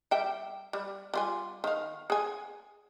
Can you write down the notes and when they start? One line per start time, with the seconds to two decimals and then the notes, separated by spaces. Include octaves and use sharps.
0.11 G3 E5 G5
0.73 G3
1.14 G3 F4 G#5
1.64 D#3 F5
2.10 G#4 G#5